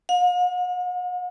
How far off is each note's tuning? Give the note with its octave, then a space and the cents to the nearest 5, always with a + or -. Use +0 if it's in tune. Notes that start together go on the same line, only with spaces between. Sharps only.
F5 +45